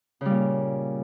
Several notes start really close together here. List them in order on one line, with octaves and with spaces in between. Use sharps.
C#3 G3 A#2